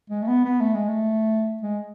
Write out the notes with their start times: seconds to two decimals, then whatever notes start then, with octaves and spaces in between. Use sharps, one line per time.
0.10 G#3
0.22 A3
0.28 B3
0.45 B3
0.61 A3
0.74 G#3
0.88 A3
1.63 G#3